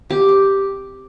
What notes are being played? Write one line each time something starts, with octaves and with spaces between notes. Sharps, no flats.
C3 G4
C4